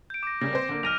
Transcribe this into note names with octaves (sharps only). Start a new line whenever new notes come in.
G6 D7
D6 A#6
C#3 G3 A#3 A#6
C4 C5
D3 A#3
B1 F6 A#6 D#7 F7